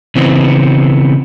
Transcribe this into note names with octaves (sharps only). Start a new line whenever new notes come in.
C#3 E3 B3 C4